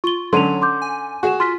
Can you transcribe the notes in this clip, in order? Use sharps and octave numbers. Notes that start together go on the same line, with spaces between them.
F4 C#6 G7
D3 F#3 C#4 C6 D#7 F7
C6 D6 G6
G#5
F#4 G#4 C#6 E7
F4 C6 F6 B6